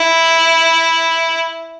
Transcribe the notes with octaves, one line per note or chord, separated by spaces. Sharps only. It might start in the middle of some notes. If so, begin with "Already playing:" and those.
Already playing: E4